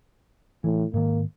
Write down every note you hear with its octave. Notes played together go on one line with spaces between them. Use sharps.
A2 E3
G#2 D#3 A#3